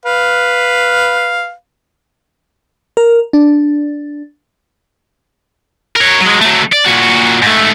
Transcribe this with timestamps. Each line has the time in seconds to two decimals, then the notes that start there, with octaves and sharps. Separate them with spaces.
0.06 B4 F5
2.97 A#4
3.33 D4
5.96 A#4 C#5
6.22 F#3 G#3
6.42 F#3 A3
6.73 D5
6.86 A#2 F#4
7.43 G#2 A3